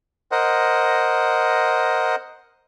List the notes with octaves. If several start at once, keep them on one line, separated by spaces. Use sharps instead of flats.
A#4 C5 D#5 F#5